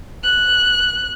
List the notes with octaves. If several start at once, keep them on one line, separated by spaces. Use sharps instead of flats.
F#6